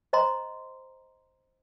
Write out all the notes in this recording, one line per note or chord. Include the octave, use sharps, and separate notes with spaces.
C5 D#5 A#5 C6